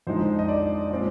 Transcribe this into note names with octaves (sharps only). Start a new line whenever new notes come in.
F2 D3 F3 G#3 D#4 C5
D#5
D5
A#2 G#3 C4